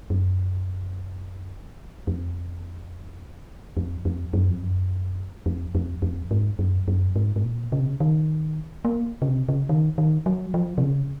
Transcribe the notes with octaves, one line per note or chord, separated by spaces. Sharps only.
F#2
F2
F2
F2
F#2
F2
F#2
F2
F2
F2
G#2
F#2
F#2
G#2
G#2
A#2
C#3
C3
C#3
D#3
A#3
C#3
C3
C#3
D#3
D#3
F#3
F3
C3
C#3